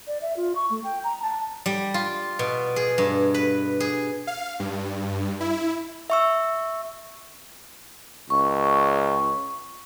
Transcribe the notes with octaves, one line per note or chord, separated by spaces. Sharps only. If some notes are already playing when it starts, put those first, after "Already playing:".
D5
E5
F4
C#6
A3
G5
A#5
A5
G3
F4
B2
G#4
G2
B4
G#4
F5
G2
E4
E5 C#6 E6
C#2 C#6